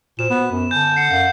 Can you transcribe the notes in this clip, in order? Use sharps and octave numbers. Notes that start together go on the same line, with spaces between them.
A#2 F#4 C5 E7
B3
F#2 B3
D3 G#5 A5 G6
F#5 C7 C#7
F#2 F5 F#5 C7